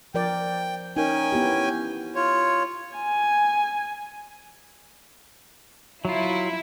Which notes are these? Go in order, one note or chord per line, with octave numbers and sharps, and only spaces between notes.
F3 A#4 D5 G5
C#4 D#4 A#4 G5 G#5
B3 E4 G4
F4 C#5
G#5
F#3 E4 F4